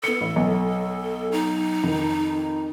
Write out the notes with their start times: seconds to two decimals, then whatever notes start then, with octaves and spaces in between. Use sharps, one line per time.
0.04 B3 A4 C#7
0.21 A1
0.36 B1
1.32 D#4
1.83 F2 D#3